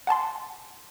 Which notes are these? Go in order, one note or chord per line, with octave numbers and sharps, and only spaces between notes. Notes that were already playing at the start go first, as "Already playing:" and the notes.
F#5 G#5 A5 C6